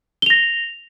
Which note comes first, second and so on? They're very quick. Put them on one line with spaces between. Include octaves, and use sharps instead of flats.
G7 F7 A#6